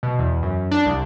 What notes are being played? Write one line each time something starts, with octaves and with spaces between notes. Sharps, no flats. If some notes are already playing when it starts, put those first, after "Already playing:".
B2
E2
F#2
D4
C2